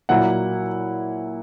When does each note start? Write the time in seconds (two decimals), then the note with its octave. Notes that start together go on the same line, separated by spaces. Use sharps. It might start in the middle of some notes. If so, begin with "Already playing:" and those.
0.09 A#2 F#3 A#3 E4 F#5